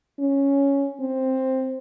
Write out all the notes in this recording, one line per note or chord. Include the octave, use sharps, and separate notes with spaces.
C#4
C4